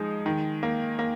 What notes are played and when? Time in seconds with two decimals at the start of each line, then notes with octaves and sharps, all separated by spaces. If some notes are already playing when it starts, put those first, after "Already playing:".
Already playing: F3 G#3 D#4
0.26 D#3
0.63 A#3
0.99 A#3